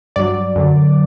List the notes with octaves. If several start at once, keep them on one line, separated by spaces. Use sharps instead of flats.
G2 F#3 D5
F#2 D3 F#3